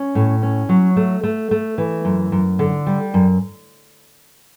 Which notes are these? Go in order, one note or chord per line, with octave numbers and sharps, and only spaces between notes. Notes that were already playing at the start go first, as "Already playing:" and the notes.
Already playing: C#4
A2
C#4
F#3
A3
A3
A3
E3
F#2
F#2
D3
G3
F#2